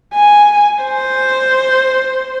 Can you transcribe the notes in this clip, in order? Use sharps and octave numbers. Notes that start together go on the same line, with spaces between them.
G#5
C5